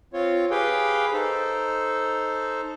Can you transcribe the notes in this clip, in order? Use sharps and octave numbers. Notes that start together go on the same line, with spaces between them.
C4 F4 C#5
G4 G#4 B4 F5 G5
D#4 A4 C5